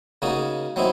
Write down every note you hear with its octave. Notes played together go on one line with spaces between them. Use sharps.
C#3 A#3 D#4 F#4
F#3 C4 D#4 E4